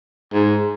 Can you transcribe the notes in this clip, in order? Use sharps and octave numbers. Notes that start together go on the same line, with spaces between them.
G#2